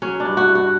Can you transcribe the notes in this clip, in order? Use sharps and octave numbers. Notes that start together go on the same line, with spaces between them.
F#3 C#4
D4
G2
F#4
G2
F#4